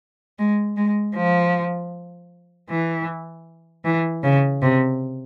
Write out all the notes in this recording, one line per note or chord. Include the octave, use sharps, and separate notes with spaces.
G#3
G#3
F3
E3
E3
C#3
C3